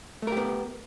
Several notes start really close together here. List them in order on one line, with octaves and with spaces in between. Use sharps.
A3 A#4 G4 B3